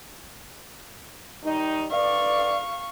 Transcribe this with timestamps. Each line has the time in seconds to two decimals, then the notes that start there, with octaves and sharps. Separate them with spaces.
1.43 D#3 G3 D#4
1.91 D3 B4 D5 F5 C#6